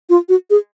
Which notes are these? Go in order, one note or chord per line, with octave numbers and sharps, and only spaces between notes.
F4
F#4
G#4